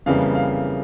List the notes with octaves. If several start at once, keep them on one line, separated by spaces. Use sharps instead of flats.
F2 C#3 E3 G3 A#3 F5
F5